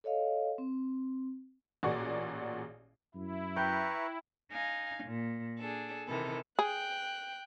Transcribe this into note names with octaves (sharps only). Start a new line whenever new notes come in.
A4 C#5 D#5 F5
C4
A1 A#2 F#4 G#4 D5 C#6
F#2 E4
B4 G5 A#5 C#6
D#4 F5 G#5
A#2
D4 G#4 A4
C3 D#3 E3 A4
G#4 G5 F#6